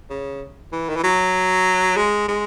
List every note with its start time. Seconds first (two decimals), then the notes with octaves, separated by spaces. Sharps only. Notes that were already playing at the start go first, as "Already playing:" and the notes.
0.10 C#3
0.72 E3
0.89 D#3
0.96 E3
1.04 F#3
1.97 G#3
2.28 G#3